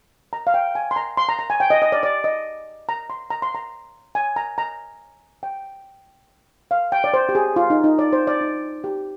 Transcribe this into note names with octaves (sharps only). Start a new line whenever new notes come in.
A#5
F5
G5
G#5
C6
A#5
C6
A#5
A#5
G#5
G5
D#5
D#5
D5
D5
D#5
A#5
C6
A#5
C6
A#5
G#5
A#5
A#5
G5
F5
G5
D5
C5
G4
G#4
F4
D#4
D#4
D5
C5
D5
D#4
G4